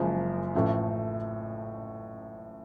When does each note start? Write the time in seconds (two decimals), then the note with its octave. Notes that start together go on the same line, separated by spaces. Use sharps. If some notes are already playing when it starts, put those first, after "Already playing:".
Already playing: F#1 F#2 F3 G#3
0.55 A1 A2 F3 A3